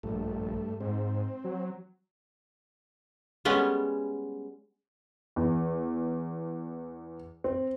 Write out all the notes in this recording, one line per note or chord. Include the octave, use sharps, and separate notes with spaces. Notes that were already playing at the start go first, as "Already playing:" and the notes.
A#1 G2 A3
G#2 C4
F#3
G3 G#3 B3 C#4
E2
C4